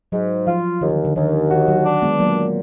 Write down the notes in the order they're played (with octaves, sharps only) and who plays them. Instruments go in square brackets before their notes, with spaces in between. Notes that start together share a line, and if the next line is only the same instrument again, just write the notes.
[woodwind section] G#2 [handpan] F#3
[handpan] F3 [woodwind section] F4
[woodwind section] D#2 [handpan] D#3
[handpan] D3
D3
[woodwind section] D#2 [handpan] D#3
[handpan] D#3 [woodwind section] F#4
[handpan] F#3
[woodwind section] D4
[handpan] G#3 B3
[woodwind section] A#2 [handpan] F#3 A#3